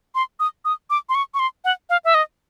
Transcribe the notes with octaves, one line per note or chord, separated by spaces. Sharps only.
C6
D#6
D#6
D6
C6
C#6
C#6
C6
F#5
F5
E5
D#5